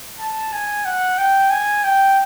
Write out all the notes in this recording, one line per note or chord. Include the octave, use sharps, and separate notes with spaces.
A5
G#5
F#5
G5
G#5
G5